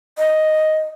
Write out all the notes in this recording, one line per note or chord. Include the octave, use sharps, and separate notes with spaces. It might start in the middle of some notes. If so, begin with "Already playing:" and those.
D#5